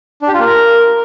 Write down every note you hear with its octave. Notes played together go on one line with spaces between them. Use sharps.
D4
G4
F4
A#3
A#4